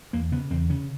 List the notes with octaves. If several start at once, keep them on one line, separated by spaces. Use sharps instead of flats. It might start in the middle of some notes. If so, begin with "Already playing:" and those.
E2 A#3
C#3 B3
E2 C4
C#3 C#4